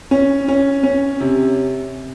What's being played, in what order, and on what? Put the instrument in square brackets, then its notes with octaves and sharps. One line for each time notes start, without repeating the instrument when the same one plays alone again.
[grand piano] C#4
C#4
C#4
C3